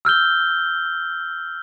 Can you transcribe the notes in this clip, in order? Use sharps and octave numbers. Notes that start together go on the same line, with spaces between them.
E6 F6 G6 G7